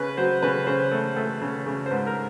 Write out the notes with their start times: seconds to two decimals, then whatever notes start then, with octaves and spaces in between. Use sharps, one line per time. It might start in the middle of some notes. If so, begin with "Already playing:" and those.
Already playing: C#3 B4
0.17 F#3 C5
0.43 C#3 B4
0.67 C#3 C5
0.91 A3
1.17 A3
1.41 C#3
1.66 C#3
1.86 C5
1.91 G#2 B4
2.07 A#4